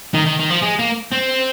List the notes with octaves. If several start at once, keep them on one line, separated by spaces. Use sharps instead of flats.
D#3
D#3
D#3
F3
G#3
A#3
C4